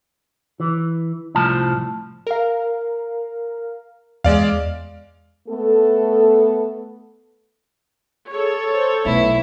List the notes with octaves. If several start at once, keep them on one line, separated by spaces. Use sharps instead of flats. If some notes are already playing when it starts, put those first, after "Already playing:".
E3
C2 A2 F3 A5
A#4 F5
E2 G#3 D5 F5
A3 B3 A4
G#4 A4 C#5
C5
B1 A3 B3 E4